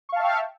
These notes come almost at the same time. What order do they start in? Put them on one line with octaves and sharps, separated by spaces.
C#6 F5 A5 E5 G5